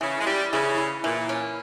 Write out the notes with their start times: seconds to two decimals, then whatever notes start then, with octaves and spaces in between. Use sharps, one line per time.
0.01 C#3 E3
0.20 G#3
0.26 E3 G3
0.52 C#3 E3
0.78 E3
1.04 A#2 E3
1.29 C#4